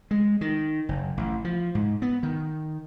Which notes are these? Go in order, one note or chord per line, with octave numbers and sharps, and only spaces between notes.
G#3
D#3
F#1
A1
F3
G#2
B3
D#3